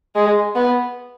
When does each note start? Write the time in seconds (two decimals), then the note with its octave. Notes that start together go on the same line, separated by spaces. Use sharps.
0.15 G#3
0.55 B3